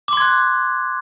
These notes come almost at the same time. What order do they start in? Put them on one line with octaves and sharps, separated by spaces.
D6 C6 G#6 F#6